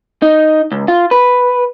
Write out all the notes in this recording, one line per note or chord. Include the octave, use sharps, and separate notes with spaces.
D#4
C#2
F4
B4